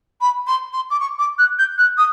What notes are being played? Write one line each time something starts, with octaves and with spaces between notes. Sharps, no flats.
B5
C6
C6
D6
C#6
D6
F#6
G6
F#6
D#6